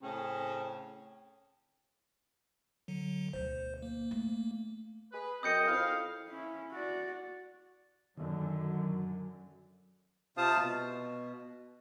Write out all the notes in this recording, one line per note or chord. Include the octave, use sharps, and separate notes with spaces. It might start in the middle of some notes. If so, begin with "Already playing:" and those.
A2 C#3 C4 C#4
D3 F#3
D2 B2 C5
A#3
A3
G#4 B4
F#2 C4 D#5 D#6 G6 C#7
F2 E4 F5
C#4 E4
F#4 D5
F#2 D3 D#3 F#3
C3 F4 C5 F5 A5 D#6
B2